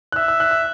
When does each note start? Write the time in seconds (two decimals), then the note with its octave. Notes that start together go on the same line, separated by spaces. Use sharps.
0.12 F#6
0.16 E5 E6
0.28 E6
0.40 F#6
0.51 E6